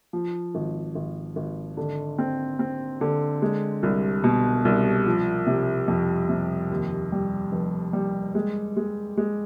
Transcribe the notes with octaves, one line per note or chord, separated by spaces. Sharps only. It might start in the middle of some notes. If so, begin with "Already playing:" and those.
F3
G#1
G#1
G#1
D3
C4
C4
D3
G#3
C2
B2
C2
F3
C3
F2
C3
D#2
G3
F1
G3
G#3
G#3
G#3